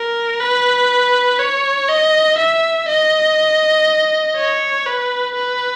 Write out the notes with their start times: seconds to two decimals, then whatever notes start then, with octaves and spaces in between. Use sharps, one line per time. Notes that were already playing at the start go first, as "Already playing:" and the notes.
Already playing: A#4
0.40 B4
1.39 C#5
1.89 D#5
2.38 E5
2.88 D#5
4.37 C#5
4.86 B4
5.35 B4